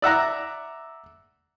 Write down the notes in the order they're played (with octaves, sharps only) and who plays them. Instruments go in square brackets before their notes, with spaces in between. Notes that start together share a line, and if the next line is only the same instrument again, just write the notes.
[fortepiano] D5 E5 F#5 A#5